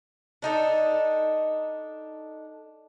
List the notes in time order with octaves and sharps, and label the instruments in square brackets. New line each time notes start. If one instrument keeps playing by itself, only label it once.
[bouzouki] D4 D#4 A4